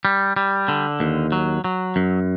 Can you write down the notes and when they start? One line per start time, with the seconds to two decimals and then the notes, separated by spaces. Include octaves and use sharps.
0.05 G3
0.36 G3
0.68 D3
1.00 D#2
1.32 F#3
1.64 F#3
1.96 F#2